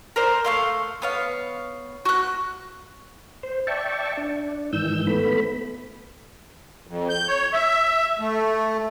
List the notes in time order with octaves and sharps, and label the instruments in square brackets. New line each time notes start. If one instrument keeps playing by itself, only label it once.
[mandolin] A#4 C5 D5
A3 F5 C6
B3 C#5 F5
F#4 F#6
[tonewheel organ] C5
D5 E5 G5 A5 C#6
D4
G#2 D#3 E3 E6 G6
A3 B3 B5
[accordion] F2
G6
C#5
E5
A3